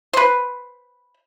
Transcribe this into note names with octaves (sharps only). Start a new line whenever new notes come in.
B4 C5